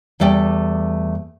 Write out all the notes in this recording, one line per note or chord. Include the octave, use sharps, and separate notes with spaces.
E2 G3 A3 D5 G5